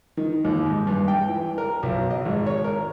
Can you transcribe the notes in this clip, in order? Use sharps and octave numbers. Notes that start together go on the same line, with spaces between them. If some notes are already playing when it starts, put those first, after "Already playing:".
D#3
D#2
G#2
G2
G5
E3
A#4
B1
D#5
G#1
C#5
A#4